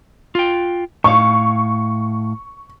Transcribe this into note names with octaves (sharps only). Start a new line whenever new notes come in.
F4 G5
A2 F5 C#6